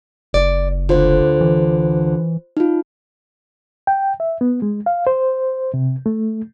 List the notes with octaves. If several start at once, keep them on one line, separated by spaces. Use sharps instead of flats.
F#1 D5
D2 D3 F4 C5
E3
D#4 F4
G5
E5
B3
G#3
F5
C5
C3
A3